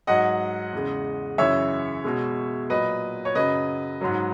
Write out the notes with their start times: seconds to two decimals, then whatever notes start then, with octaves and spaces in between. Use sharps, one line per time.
0.07 G#2 F#3 D#5 F#5
0.73 E2 C#3 G#3
1.38 F#2 C#3 E3 C#5 E5
2.04 B2 G#3
2.70 A#2 F#3 B4 D#5
3.25 C#5
3.35 F#2 C#3 F#3 B4 D#5
4.01 G#2 F#3